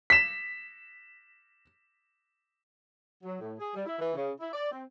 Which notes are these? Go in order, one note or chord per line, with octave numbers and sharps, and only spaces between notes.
B6 E7
F#3
A2
G#4
G3
E4
E3
C#3
E4
D5
C4